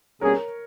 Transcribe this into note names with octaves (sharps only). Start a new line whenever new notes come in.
B2 G3 A#3 C#4 G#4 A#4 C#5